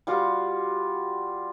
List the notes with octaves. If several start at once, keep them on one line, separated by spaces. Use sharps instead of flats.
G3 F4 F#4 F5